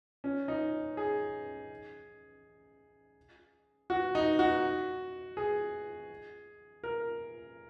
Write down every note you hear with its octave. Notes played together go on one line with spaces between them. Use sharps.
C#4
D#4
G#4
F#4
D#4
F#4
G#4
A#4